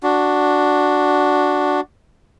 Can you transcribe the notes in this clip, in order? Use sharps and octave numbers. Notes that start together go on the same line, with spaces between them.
D4 F#4